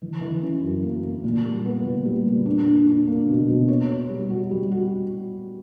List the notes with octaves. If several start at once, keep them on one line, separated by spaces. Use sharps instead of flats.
E3
E3
C#4
F#2
A#3
A#3
A#2
G3
B3
A#2
G3
A#2
D4
D4
D4
A#3
B2
B2
C#5
C#5
G3
F#4
G3
F#4